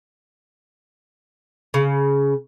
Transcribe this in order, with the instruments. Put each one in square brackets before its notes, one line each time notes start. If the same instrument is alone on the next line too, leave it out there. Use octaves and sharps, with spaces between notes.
[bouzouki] C#3